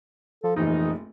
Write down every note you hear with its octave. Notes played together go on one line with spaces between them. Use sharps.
F3 A4
F1 A#1 E3 D#4